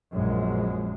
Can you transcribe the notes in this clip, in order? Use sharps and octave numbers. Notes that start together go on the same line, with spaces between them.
A#1 F#2 A#2 G#3